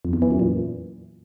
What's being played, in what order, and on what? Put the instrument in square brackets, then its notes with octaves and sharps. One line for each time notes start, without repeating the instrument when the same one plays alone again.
[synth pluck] F2
E2
E3
F#2
A#2